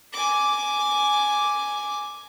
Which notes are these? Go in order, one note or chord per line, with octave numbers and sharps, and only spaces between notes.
G#5 D6